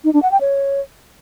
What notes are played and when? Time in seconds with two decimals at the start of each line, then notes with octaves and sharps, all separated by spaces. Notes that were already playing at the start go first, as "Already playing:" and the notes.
0.04 D#4
0.13 D4
0.22 F#5
0.31 G5
0.41 C#5